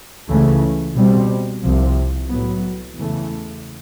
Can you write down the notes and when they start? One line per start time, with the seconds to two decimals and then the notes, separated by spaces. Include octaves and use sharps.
0.29 C#2 C#3 E3 A3
0.96 B2 G3 C4
1.63 C2 C3 F3
2.30 A2 F#3 B3
2.96 E2 C#3 E3 A3